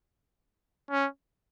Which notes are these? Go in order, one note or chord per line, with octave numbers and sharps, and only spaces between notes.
C#4